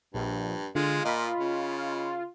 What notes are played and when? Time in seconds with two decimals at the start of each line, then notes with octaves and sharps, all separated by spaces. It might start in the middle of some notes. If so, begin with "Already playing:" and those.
0.14 A#1 G2
0.75 D3 G#3 F4
1.05 A#2 D#5 B5
1.39 C#3